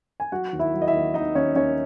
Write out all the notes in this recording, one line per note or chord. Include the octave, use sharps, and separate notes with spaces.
G#5
F#3 F#4 F#5
D#2
E4 E5
F#3
D#5
E4 E5
D#2
D#2 D#4 D#5
D#2 C#4 C#5
D#2 C#4 C#5